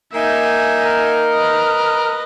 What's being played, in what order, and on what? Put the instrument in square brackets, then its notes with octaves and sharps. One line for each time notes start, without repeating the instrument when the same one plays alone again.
[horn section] A#3 D#4 [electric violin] E5 G#5
[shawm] A#4
[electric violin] B4 D#5